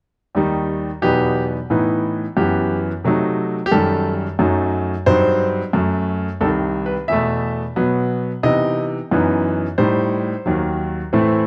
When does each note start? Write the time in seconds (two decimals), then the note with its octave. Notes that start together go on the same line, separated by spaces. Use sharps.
0.35 D#2 D#3 G3 D#4
1.02 E2 B2 F#3 B3 D#4 G4
1.70 A2 E3 B3 D#4
2.37 F#2 E3 B3 G4
3.04 C3 F#3 A3 D#4
3.66 G4
3.72 F#2 D#3 G3 A4
4.39 F#2 F#3 A3 D#4
5.06 G2 F#3 C4 D#4 C5
5.73 F#2 F#3 A3
6.41 C2 C3 D#3 A4
6.86 B4
7.08 E2 B2 A3 E5
7.76 B2 F#3 B3
8.43 C3 E3 B3 D#4 D#5
9.11 F#2 E3 B3 D#4
9.78 A2 G3 D#4 C5
10.46 D#2 D#3 F#3
11.13 A2 E3 A3 C4